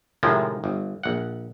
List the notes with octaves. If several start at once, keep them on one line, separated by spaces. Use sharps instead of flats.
A2 C3 D#3 F3 G#3
G1
A#1 F#5